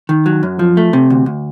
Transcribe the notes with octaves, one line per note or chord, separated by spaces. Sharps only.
D#3
F#3
F#2
F3
A3
C3
D2
D2